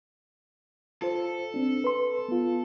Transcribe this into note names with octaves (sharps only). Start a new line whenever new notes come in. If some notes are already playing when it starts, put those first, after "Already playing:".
F4 A4 C5
C4 D4
B4 C6
B3 F4